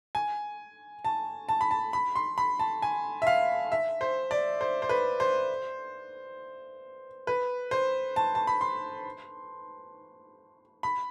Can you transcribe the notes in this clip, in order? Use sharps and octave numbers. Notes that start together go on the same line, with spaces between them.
G#5
A5
A5
B5
A5
B5
C6
B5
A5
G#5
E5
F5
E5
C5
D5
C5
C5
B4
C5
B4
C5
A5
A5
B5
C6
B5